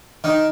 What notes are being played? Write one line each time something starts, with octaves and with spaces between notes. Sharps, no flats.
D#3